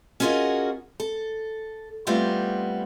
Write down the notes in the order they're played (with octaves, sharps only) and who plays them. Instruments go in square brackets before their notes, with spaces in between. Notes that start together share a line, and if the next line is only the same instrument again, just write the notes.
[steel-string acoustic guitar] C#4 F4 F#4 G#4 A#4 D#5
A4
G3 A3 B3 C4 F4